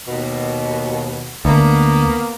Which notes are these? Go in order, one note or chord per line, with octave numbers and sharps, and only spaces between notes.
D#2 B2
D2 A#3 B3